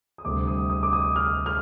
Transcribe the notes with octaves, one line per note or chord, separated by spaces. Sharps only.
D#6
D2 C3 G3 D6
D#6
D#6
D6
D#6
F6
F6